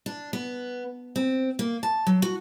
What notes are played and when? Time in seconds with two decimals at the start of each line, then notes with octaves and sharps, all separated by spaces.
0.06 D4
0.33 B3
1.16 C4
1.59 A#3
1.83 A5
2.07 F#3
2.22 F#4